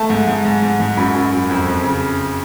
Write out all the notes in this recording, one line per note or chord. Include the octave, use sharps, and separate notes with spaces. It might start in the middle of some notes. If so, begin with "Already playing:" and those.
Already playing: A3 A5
G#2
G#2
G#2
G#2
G#2
F#2 B5
F#2
F#2
F2
F2
C#3